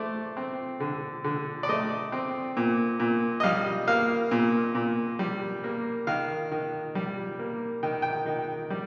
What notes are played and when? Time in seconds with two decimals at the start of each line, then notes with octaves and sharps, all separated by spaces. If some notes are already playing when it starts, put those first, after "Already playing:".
Already playing: A3 C5 D5
0.37 C4
0.80 D3
1.24 D3
1.63 D5
1.69 A3 D#5
2.12 C4
2.57 A#2
3.00 A#2
3.40 D#5
3.43 G3 F5
3.87 A#3 F5
4.31 A#2
4.75 A#2
5.19 G3
5.64 A#3
6.07 D#3 F5
6.52 D#3
6.95 G3
7.39 A#3
7.83 D#3 G5
8.02 G5
8.26 D#3
8.70 G3